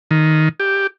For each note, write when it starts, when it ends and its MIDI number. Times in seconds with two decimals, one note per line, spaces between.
0.11 0.49 51
0.60 0.87 67